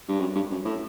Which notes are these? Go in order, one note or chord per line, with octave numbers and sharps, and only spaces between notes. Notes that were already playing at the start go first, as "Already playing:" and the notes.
G2
F#2
G2
F#2
A2